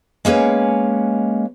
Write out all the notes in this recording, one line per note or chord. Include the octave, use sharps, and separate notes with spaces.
G#3 A#3 C#4 B4